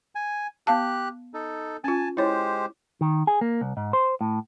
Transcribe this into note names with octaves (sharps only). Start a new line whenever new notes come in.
G#5
B3 G4 F5 A5 F#6
D#4 A4
C#4 F4 G#5 A5
G#3 E4 G4 C5 C#5
D#3
G#4
A#3
C2
G#2
C5
A2